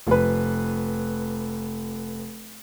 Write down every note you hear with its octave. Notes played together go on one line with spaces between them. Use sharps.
F1 B4